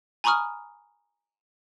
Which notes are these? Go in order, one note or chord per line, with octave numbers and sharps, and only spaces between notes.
G#5 A#5 B5 C#6 D#6 F6